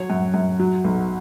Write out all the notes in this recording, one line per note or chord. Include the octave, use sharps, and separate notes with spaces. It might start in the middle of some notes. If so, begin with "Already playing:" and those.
Already playing: F#3 C#5
F#2
F#2
F#3
B1